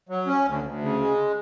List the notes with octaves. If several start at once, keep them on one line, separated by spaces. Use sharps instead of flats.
F#3
C#4
D2
D2
C#3
G#3